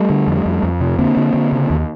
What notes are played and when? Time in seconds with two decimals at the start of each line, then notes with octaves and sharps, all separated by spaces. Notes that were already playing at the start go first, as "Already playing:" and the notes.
Already playing: G3 A3
0.10 D3
0.27 F2
0.45 F2
0.63 F2
0.81 C3
0.99 D3 A#3 C4
1.17 D3
1.34 D3
1.52 C#3
1.70 D#2